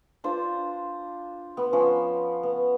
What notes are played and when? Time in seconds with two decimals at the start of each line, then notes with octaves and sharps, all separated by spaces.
0.24 D4 F4 C5
1.57 B3
1.73 F3 C#4
2.43 B3